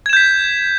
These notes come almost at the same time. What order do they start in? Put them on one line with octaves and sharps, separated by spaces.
G#6 E7 G6 B6